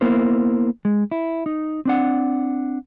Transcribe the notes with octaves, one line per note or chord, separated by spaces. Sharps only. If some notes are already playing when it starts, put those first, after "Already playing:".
A#3 B3 E4 A#4 C5
G#3
E4
D#4
C4 D4 F#5